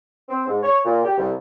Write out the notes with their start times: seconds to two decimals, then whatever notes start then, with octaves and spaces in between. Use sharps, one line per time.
0.29 C4
0.47 G#2
0.63 C#5
0.84 A#2
1.04 G4
1.18 C2